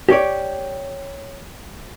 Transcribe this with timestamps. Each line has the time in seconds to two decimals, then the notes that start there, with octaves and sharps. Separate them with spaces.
0.09 G4 C#5 D5